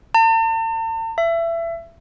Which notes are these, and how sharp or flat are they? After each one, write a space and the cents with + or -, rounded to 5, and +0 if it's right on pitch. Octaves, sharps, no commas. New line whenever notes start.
A5 +45
E5 +25